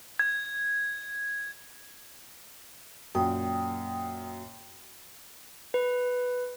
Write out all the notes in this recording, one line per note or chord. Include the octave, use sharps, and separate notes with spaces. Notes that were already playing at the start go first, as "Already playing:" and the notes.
G#6
F#2 A#2 G5 D#6
B4